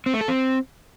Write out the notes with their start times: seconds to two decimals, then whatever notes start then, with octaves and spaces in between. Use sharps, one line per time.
0.06 C4
0.14 A3
0.21 A4
0.28 C4